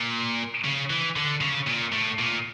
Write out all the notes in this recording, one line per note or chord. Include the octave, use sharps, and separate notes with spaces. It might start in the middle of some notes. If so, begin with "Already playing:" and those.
Already playing: A#2
C#3
E3
D3
C#3
A#2
A2
A#2